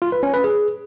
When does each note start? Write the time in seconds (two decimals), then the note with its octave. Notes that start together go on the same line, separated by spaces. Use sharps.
0.02 F4
0.12 B4
0.23 C#4
0.33 B4
0.44 G#4